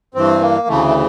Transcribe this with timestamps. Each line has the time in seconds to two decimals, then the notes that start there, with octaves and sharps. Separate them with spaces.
0.14 G2 E3 C4
0.41 A#3
0.67 D2 C#3 E3 A3
0.88 A3